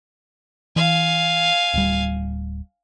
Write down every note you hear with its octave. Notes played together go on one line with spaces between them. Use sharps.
E3 F5 G#5
D1 G3